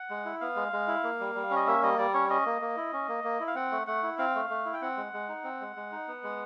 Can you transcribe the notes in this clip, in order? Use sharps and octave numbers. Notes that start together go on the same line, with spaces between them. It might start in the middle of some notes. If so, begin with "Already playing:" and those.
Already playing: F#5
G#3
E4
B3 F5
G#3
G#3
E4
A#3
G3
G3
C#4
D#5
A#3 E5
G3 D#5
G3 D5
C#4 C#5
C#4 D#5
A#3
A#3
E4
C#4
A#3
A#3
E4
F5
C4 F#5
A3
A3 F#5
E4
C4 F5
A3
A3
E4
G5
C4 F#5
G#3
G#3
D#4
C4
G#3
G#3
D#4
B3
G#3